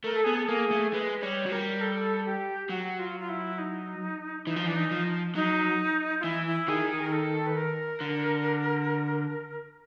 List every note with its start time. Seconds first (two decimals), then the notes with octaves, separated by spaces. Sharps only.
0.04 A3 A#4
0.15 A4
0.24 B3 G#4
0.35 A4
0.48 A#3 G#4
0.70 A3
0.92 G#3 B4
1.22 G3 C#5
1.46 F#3
1.52 G3 A#4
1.81 A4
2.25 G4
2.69 F#3 F#4
2.99 F4
3.20 F4
3.29 E4
3.58 D#4
4.47 E3 D#4
4.56 F3
4.66 E3 D4
4.76 D#4
4.91 F3
5.35 F#3 D#4
6.20 F4
6.24 E3 E4
6.46 E4
6.68 D#3 G#4
6.91 G#4
7.02 A#4
7.12 A4
7.47 B4
7.57 A#4
8.01 D3